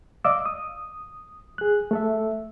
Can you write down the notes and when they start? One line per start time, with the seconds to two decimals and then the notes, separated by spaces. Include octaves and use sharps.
0.24 D5 D#5 F5 D6 E6
0.46 D#6
1.58 G#4 F#6
1.91 A3 A4 E5